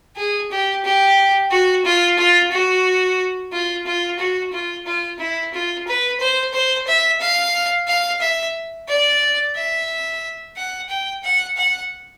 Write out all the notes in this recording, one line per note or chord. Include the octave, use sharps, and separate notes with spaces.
G#4
G4
G4
F#4
F4
F4
F#4
F4
F4
F#4
F4
F4
E4
F4
B4
C5
C5
E5
F5
F5
E5
D5
E5
F#5
G5
F#5
F#5